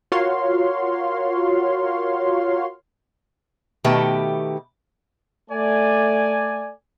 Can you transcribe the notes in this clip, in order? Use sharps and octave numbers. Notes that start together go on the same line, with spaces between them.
F4 F#4 A#4 C#5 F5 C6
B2 D#3 A3 G4 B4 E5
A3 D5 G#5